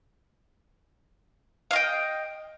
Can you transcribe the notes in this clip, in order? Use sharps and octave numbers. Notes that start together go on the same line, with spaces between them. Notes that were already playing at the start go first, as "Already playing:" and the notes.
D#5 F5 G5